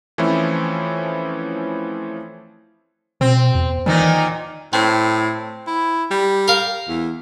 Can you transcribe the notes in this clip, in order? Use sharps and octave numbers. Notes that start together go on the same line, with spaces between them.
E3 F3 A3 C4 C#4 E4
B2 C4
E2
A#2 D#3 E3 D#4
A2 C4
E4
G3
A#4 F5
E2